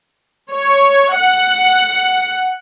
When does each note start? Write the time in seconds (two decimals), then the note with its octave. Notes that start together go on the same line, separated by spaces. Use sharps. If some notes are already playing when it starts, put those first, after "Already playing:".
0.52 C#5
1.17 F#5